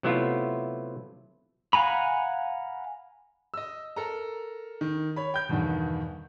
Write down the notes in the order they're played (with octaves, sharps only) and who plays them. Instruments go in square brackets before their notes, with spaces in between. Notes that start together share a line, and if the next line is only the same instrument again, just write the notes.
[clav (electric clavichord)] C3 F#3 A3 B3 E4 F4
[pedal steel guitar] F5 F#5 G#5 A#5 B5
[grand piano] D#5 E6
A4 A#4 A#5
D#3
C#5 B5
G5 G6
E2 G2 B2 D3 D#3